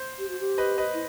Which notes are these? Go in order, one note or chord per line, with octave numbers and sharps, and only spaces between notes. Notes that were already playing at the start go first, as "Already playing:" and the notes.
Already playing: C5
G4
F#4
G4
B4 D#5
B4 D#5
E4